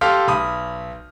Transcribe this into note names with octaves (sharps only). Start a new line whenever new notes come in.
G4 A4 F5 G5 C6 F6
B1 B5 D#6